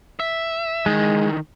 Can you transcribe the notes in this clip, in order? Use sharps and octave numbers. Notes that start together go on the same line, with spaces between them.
E5
D#3 E3 G#3